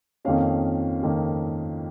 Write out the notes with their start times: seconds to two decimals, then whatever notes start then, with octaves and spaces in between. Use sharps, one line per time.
0.25 F2 D#3 A#3 C#4 F5
1.03 F2 D#3 A#3 C#4